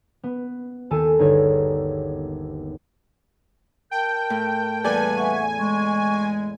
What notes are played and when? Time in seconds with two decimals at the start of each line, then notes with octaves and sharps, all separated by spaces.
0.23 B3
0.90 D#2 D#3 A4 G#5 D#7
1.19 G1 D#4 G#4 C#5
3.91 A#4 G5 A5 G6
4.30 A2
4.84 E2 G3 A#3 A4 B4 D5 G#5
5.17 E5 F#5 C#6
5.60 G#3 C#6